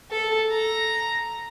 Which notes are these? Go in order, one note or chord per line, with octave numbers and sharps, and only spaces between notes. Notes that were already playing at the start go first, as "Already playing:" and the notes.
A4
A#5